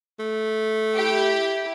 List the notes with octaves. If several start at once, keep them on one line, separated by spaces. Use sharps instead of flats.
A3
E4 G4